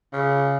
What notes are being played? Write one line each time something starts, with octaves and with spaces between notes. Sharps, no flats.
C#3